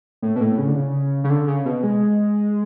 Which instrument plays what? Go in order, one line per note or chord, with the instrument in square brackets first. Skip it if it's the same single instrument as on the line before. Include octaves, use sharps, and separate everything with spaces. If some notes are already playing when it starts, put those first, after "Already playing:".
[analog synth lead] A2
B2
A2
C#3
D3
C#3
C#3
D3
C#3
B2
G#3